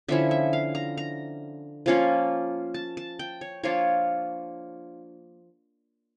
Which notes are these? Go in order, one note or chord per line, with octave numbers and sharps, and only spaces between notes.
D3 F3 C#4 E4 E5
E5
F5
A#5
A#5
F3 A#3 C#4 F4
A5
A5
G5
C#5
F3 A#3 D4 F4 C#5